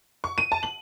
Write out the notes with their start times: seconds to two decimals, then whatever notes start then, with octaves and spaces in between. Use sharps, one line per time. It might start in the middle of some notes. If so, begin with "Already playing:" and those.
0.24 C#6
0.38 D#7
0.52 A5
0.63 F#7